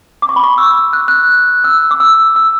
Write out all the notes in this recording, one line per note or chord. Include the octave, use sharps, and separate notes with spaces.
D6
C#6
B5
C#6
E6
F#6
F#6
E6
D6
E6
E6